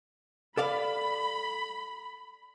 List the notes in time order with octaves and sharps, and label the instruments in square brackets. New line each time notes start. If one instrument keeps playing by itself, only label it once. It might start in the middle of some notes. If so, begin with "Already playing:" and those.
[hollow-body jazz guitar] A4 D5 F5 [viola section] B5